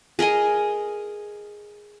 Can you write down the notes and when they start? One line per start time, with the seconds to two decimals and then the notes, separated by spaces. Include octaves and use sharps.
0.19 G#4 A#4 D#5 G#5